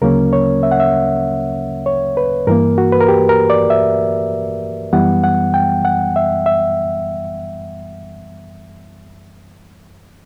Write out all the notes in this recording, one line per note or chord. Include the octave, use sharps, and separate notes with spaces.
D2 C#3 F#3 A#3 C#4 A#4
C#5
E5
F#5
E5
C#5
B4
G2 E3 A#3 A#4
F#4
B4
A#4
G4
A#4
D5
E5
F#2 E3 G3 B3 F#5
F#5
G5
F#5
E5
E5